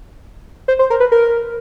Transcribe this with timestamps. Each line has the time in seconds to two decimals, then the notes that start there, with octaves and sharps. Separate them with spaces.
0.68 C5
0.79 C5
0.90 A#4
1.00 B4
1.12 A#4